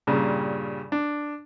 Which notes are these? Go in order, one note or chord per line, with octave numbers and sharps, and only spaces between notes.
G2 A#2 C#3 G3
D4